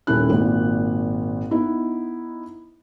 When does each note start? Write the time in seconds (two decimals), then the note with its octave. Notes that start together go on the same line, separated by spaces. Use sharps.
0.07 D#1 D#3 C#4 E4 F#6
0.30 G#1 A#2
1.51 B3 D#4 E4